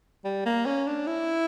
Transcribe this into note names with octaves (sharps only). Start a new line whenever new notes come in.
G3
A#3
C#4
D4
E4